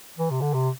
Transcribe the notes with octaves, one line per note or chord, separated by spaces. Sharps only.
E3
C3
D3
C3